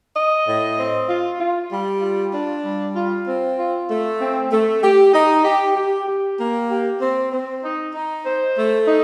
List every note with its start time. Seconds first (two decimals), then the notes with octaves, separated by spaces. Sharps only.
0.15 D#5
0.47 A2
0.78 C4
1.09 F4
1.40 F4
1.71 G3
2.02 F4
2.33 D4
2.64 G3
2.96 F4
3.27 C4
3.58 F4
3.89 A3
4.20 C4
4.51 A3
4.82 G4
5.13 D#4
5.45 G4
5.76 G4
6.07 G4
6.39 A#3
6.70 G4
7.01 C4
7.32 C4
7.63 D#4
7.94 D#4
8.25 C5
8.56 A3
8.88 D#4